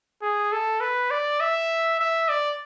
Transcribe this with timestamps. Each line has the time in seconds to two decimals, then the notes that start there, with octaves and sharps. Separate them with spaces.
0.22 G#4
0.52 A4
0.81 B4
1.11 D5
1.40 E5
1.99 E5
2.29 D5